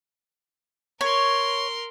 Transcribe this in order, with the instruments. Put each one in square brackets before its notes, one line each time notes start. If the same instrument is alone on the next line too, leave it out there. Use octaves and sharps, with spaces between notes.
[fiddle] A#4 C6 [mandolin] C#5